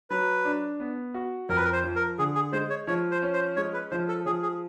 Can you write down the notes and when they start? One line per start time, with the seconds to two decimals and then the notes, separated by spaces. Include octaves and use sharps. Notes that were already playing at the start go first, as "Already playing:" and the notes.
0.10 F#3 B4
0.45 D4
0.80 B3
1.14 F#4
1.49 F2 A#4
1.57 B4
1.64 A#4
1.73 C5
1.83 F3
1.96 A#4
2.18 D3 G#4
2.35 G#4
2.53 G#3 C5
2.70 C#5
2.87 F3 C#5
3.11 C5
3.22 C#4
3.33 C5
3.56 G#3 C#5
3.73 B4
3.91 F3 C5
4.08 A4
4.26 F3 G#4
4.43 G#4